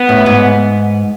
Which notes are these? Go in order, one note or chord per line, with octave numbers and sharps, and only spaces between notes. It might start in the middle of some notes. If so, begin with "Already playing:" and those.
Already playing: B3
A2
G#2